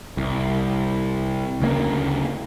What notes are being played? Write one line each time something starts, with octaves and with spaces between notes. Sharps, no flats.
C2
D2 C#3 G#3 A#3